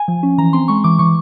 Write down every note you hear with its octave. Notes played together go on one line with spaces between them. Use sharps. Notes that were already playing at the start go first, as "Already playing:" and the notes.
Already playing: G#5
F3
C#4
E3 A#5
C4 C6
G#3 C#6
E3 D6
E3 C#6